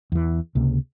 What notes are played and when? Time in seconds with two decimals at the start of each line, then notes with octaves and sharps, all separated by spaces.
0.12 E2 E3
0.55 C#2 C3 A#3